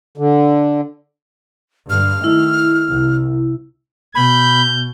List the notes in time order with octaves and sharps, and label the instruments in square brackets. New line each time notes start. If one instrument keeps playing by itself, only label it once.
[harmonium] D3
[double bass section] G2 D3 [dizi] F6
[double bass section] D#3 A3 [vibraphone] E4
[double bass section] C2
[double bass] B2 [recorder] B5 [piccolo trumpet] G6